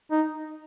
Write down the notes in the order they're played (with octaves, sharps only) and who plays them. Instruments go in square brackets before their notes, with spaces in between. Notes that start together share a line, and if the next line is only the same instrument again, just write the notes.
[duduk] D#4